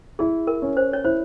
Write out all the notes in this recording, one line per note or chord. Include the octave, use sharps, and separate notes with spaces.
E4 G#4
A#4
C#4
C5
C#5
E4 C5